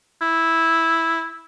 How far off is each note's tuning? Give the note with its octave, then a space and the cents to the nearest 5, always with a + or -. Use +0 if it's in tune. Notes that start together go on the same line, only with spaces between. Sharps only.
E4 -5